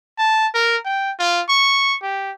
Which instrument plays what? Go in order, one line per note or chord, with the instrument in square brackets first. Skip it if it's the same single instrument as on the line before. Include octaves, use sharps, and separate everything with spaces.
[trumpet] A5
A#4
G5
F4
C#6
G4